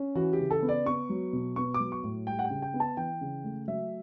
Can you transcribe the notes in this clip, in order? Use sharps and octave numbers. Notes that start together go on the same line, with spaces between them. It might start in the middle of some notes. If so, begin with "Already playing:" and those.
Already playing: C#4
E3 F#4
G4
C#3
A4
B3
D5
B3 C#6
F#3
B2
B3 C#6
D6
F#3
C#6
A2
G3 G5
F#5
G5
C#3
G5
B3
A5
E3 G5
C#3
A3
F#3 E5